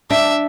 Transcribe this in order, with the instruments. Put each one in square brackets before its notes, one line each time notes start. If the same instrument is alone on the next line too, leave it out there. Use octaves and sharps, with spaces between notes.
[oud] D4 [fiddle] E5